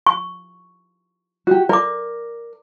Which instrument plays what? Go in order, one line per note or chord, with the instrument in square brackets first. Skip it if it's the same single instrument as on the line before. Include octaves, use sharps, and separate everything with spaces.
[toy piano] C#6
[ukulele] F#4 G4
[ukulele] A#4 [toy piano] D5 D6